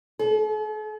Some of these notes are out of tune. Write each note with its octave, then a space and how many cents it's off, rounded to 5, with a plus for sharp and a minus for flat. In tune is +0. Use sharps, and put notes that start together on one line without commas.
A4 -45